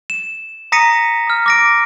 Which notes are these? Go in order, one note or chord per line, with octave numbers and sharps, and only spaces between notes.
E7
A#5 D#6 A#6 B6 C#7 D#7
D#6 F6
D6 A#6 D7